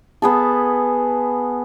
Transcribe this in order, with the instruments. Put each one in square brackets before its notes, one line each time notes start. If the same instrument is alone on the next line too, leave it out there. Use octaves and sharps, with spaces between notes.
[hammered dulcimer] B3 G#4 A4